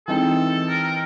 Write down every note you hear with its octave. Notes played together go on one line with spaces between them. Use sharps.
E3 G#3 C4 D#4 A4
A#4
A#4